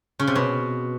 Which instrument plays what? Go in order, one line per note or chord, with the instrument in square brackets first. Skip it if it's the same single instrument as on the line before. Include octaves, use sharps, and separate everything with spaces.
[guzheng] C#3
C3
B2